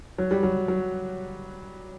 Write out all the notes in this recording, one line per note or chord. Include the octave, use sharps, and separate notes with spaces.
F#3
G3
F#3
F#3